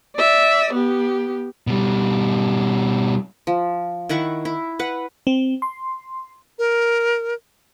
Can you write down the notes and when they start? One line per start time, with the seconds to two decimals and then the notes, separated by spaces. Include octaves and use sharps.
0.16 D5 E5
0.73 B3 G4
1.67 B2 G3
3.47 F3
4.09 D#3 E4 F#5 C#6
4.45 E4
4.79 B4 F#5
5.27 C4
5.62 C6
6.58 A#4